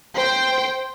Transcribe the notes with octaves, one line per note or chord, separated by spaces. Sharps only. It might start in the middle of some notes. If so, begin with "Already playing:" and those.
C5 G5